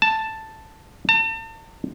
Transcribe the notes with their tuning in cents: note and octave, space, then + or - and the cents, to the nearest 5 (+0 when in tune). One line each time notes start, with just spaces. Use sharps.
A5 +5
A5 +40